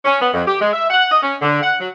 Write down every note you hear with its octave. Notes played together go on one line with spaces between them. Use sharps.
C#4
B3
F2
G4
G#3
E5
F#5
D#5
C#4
D3
F#5
F#3